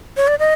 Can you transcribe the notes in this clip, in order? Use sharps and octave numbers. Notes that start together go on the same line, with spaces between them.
C#5
D5
D#5